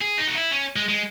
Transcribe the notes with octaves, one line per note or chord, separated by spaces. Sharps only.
G#4
D#4
F#4
E4
C#4
G#3
G#3